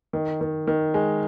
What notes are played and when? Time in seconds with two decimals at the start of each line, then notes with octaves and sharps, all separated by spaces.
0.13 D#3
0.41 D#3
0.67 D#3
0.94 G#3